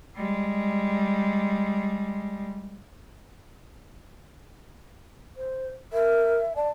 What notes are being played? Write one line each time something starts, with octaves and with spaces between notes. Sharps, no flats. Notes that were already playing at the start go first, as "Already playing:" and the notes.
G3 G#3
C5
A#4 E5
D5 A5